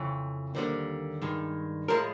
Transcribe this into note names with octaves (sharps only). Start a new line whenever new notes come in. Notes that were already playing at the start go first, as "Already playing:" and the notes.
Already playing: F2 C#3 E3
D#2 D3 G3 A#3 C5
G2 D#3 G#3
A2 F3 G#3 A#4